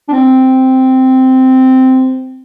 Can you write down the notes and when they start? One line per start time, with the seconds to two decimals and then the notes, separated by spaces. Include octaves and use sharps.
0.08 D4
0.12 C4